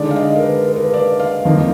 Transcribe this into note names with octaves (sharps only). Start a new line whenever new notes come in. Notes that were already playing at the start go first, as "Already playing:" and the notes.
Already playing: D3 G#3 D#4 D5
F5
D#5
A#4
B4
B4
A#4
B4
D5
F5
F2 F3 A#3 D#4